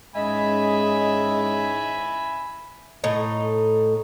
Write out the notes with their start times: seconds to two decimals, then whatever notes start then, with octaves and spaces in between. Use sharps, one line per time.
0.15 G#2 G#3 C#4 D#5 E5 G#5 B5
3.04 A2 D#4